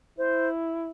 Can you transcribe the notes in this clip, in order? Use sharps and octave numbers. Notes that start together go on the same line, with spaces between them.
E4 C5